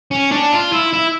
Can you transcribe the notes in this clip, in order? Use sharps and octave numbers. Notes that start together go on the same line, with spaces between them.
C#4
D4
F4
E4
E4